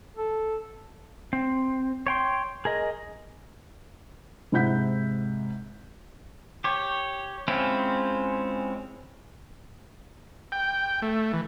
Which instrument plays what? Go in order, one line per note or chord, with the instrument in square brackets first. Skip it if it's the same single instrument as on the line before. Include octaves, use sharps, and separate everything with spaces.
[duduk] A4
[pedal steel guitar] C4
C#5 G5 C6
G#4 A#4 D#5
[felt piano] G#2 C3 E4 F#5 G6 B6
[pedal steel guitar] G4 C#5
G#3 C4 C#4 E4 F4
[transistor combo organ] G5
A3
E3